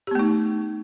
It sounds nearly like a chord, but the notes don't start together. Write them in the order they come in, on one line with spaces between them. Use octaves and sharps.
G4 B3 A3 D#4